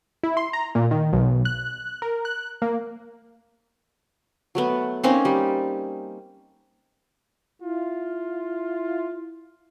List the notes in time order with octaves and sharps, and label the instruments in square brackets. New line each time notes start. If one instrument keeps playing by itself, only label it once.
[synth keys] E4
C6
A#5
A#2
D#3
B1
F#6
A#4
F#6
A#3
[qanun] F#3 A3 B3
A#3 C4 C#4 D#4
G3
[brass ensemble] E4 F4